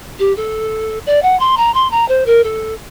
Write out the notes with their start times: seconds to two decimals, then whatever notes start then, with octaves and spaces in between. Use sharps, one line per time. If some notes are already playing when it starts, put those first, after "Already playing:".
0.19 G4
0.36 A4
1.06 D5
1.22 F#5
1.39 C6
1.57 A#5
1.74 C6
1.91 A#5
2.08 C5
2.26 A#4
2.43 A4